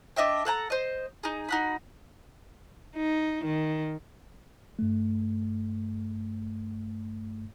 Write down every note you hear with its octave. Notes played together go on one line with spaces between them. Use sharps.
D4 D#5 E5 G5
A4 F#5 G5 A#5
C5 D#5
D#4 G#4
D#4 F#4 B5
D#4
D#3
G2 A3